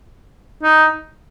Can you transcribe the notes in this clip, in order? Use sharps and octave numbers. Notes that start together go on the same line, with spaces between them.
D#4